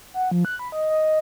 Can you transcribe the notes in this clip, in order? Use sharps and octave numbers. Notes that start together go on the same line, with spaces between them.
F#5
F3
F#6
B5
D#5
D#5